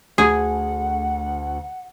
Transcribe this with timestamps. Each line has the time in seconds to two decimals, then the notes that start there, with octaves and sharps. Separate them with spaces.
0.18 D2 G#4 F#5